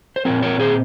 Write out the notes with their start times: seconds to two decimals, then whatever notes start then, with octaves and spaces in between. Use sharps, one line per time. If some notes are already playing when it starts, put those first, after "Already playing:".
0.16 C5
0.25 A#2 F3 C4 A#4 C#5
0.43 A#4 C#5
0.59 G#4 C5